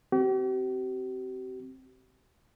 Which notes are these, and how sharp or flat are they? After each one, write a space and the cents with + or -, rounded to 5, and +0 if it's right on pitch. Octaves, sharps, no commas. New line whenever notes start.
C4 +0 G4 -45